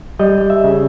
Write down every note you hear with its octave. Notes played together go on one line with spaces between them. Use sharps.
G3 D#5
E5
C#3